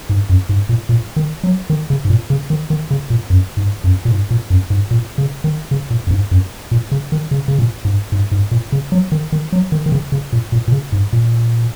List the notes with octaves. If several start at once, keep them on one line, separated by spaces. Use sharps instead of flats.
G#2
F#2
G#2
A#2
A#2
D#3
F#3
D#3
C#3
G#2
A#2
C#3
D#3
D#3
C#3
A#2
F#2
G#2
F#2
A#2
G#2
A#2
F#2
G#2
A#2
C#3
D#3
C#3
A#2
F#2
G#2
F#2
A#2
C#3
D#3
C#3
C#3
A#2
G#2
G#2
G#2
A#2
C#3
F#3
D#3
D#3
F#3
D#3
D#3
C#3
C#3
A#2
A#2
A#2
C#3
G#2
A#2